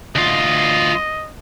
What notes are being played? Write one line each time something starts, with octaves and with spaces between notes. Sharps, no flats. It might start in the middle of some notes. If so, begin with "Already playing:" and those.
D2 F4 D#5